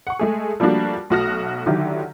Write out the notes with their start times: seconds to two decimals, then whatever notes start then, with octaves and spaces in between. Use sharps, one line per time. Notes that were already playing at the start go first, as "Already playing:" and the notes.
0.07 F#5 C#6
0.19 G#3 A3 G#4
0.60 F3 G3 A3 A#3 D4 F#4
1.10 B1 A3 F#4 D#6 F6 A#6
1.66 D3 D#3 F#3 E4 G4